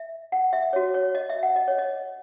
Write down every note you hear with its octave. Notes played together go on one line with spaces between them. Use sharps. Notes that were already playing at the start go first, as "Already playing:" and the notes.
Already playing: E5
F#5
E5
F#4 C#5
C#5
D#5
E5
F#5
D#5
C#5
D#5